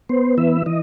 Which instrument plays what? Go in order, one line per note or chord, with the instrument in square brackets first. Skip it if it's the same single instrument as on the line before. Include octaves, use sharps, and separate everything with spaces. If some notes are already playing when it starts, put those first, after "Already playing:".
[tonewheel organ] B3 C5
E3 E5
E3 D#5